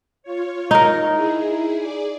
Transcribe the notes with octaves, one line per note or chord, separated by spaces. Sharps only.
F4 C#5
D#4 A#4
E4 G#4
G#4 D5